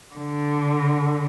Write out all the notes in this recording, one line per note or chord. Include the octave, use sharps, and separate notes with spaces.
D3